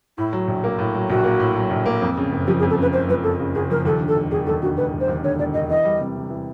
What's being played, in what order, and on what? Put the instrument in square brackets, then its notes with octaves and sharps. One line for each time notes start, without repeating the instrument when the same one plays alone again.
[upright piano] A2 [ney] E4
[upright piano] F#3
A#1
A#3
A2
F#3
[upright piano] A#1 [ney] F#4
[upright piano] A#3
A2
F#3
A#1
A#3
F2
C#3
F#1
[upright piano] F3 [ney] G4
[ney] G#4
[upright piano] F2
[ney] A4
[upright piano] C#3 [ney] B4
[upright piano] F#1 [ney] C5
[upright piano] F3 [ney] B4
[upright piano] F2 [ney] A4
[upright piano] C#3
[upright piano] F#1 [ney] G#4
[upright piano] F3 [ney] A#4
[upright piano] D#2 [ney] A4
[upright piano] D3
[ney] A4
[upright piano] E1
[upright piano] E1 [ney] G#4
[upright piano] D#2 [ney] A4
[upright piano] D3 [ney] F#4
[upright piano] E1 [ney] B4
[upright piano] E1
[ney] C5
[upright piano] D#2
[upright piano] D3 [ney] C#5
[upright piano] E1 [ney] D5
[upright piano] E1 [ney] D#5
[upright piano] E3 [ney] D#5
[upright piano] G3
C3
C3
E3